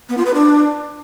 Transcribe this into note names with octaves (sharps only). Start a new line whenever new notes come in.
B3
F4
B4
D4